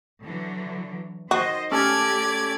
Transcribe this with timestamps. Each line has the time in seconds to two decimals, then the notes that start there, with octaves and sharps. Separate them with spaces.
0.23 D3 E3 F#3
1.31 D#3 F#4 C5 D#5
1.71 A3 C#4 G4 A4 D5 G#6